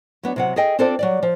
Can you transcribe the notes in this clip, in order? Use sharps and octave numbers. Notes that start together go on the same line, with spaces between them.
F#3 B3 D4
C3 F#3 F#5
G#4 A4 D#5 G5
C4 D4 F4 A4 C5 D5
F#3 G3 D5
F3